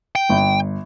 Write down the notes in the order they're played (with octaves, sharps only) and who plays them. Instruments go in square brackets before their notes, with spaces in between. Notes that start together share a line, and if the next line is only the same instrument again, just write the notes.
[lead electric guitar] G5
[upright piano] G1